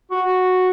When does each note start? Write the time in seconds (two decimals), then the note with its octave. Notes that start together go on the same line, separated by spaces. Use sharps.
0.11 F#4